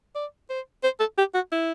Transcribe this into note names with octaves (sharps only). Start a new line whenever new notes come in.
D5
C5
C5
A4
G4
F#4
E4